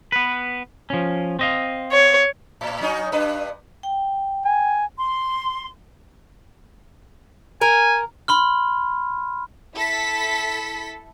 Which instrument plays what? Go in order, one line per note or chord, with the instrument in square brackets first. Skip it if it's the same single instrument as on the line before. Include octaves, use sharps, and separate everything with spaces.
[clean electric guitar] B3 B4
F3 C#4
C4 D#5 F5
[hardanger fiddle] C#5
[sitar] A2
F#3 C#4 D#4
G2 D4 B4
[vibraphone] G5
[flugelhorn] G#5
[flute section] C6
[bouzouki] A#4 [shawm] G#5
[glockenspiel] B5 C6 F6
[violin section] E4 A4 B6